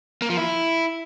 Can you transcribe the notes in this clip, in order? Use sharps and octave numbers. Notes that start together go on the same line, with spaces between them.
A#3
F3
E4